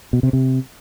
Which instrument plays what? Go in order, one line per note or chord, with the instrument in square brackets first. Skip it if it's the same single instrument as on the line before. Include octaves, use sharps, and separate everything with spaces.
[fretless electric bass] B2
C3
C3